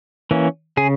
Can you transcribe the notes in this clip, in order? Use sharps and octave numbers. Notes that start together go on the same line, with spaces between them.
E3 A#3 C#4
C#3 G#4